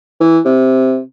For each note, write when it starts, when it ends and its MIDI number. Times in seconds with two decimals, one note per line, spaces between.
0.20 0.39 52
0.45 1.00 48